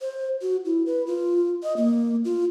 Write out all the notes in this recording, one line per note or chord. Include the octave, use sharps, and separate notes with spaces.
C5
F#4
E4
B4
F4
D#5
A#3
F4